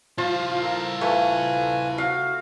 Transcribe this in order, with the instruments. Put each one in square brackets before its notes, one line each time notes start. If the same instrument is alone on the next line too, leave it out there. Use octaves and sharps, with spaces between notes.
[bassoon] F3 [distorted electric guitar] E4 C5 [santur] F4
[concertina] A4 A#4
[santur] A3 [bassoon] F4 [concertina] B4 G#5
[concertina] F#4 [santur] F5